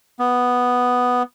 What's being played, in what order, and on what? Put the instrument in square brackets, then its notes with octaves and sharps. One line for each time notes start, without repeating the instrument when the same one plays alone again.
[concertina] B3